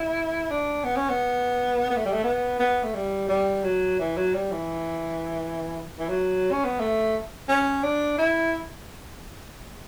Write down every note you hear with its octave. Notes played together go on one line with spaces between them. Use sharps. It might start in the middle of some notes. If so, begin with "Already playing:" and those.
Already playing: E4
D4
B3
C#4
B3
B3
A3
G3
A3
B3
B3
A3
G3
G3
F#3
E3
F#3
G3
E3
E3
F#3
C#4
B3
A3
C#4
D4
E4